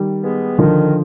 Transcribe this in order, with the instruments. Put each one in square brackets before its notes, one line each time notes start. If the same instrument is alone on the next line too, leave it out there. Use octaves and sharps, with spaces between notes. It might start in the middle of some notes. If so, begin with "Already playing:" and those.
Already playing: [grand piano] D#3 G3
[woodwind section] G#3 B3
[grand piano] D3 F3 [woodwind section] D#3